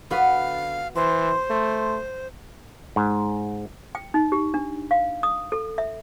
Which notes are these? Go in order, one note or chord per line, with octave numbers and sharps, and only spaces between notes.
D3 B3 F#4 B4 F5
E3 C5 C6
A3
G#2
G5
D#4
G4
D4
F5
D#6
A4
E5